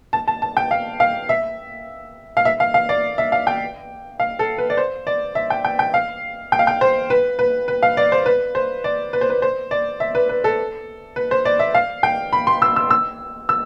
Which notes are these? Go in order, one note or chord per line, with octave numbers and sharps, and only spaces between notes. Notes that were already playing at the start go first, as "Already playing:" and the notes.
A5
A5
A5
G5
F5
F5
E5
F5
E5
F5
F5
D5
E5
F5
G5
F5
A4
B4
D5
C5
D5
E5
G5
G5
G5
F5
G5
F5
G5
C5
B4
B4
B4
F5
D5
C5
B4
C5
D5
B4
C5
B4
C5
D5
E5
B4
B4
A4
B4
C5
D5
E5
F5
G5
B5
C6
E6
E6
E6
E6